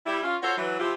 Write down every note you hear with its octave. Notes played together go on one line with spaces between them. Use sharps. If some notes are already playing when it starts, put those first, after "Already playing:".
G3 E4
C#4 F4
F4 F#4 A4 C5 C#5
E3 F#3
C3 F3 C4 E4 F4 G4